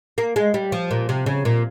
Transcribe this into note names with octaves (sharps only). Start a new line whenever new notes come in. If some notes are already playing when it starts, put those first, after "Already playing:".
A#3
G#3
G3
F3
A#2
C3
C#3
A#2